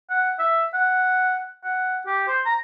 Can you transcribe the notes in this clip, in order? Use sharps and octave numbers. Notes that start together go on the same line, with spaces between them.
F#5
E5
F#5
F#5
G4
C5
A#5